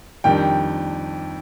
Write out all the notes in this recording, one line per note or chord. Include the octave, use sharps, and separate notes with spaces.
F2 D#3 G3 D4 G5